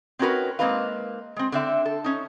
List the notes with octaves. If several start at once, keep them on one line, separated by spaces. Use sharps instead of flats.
C4 C#4 D#4 F#4 A#4 B4
G#3 A#3 C4 D#4 B4 F5
G#3 C4
D3 C4 E5
A4
C#4 D#4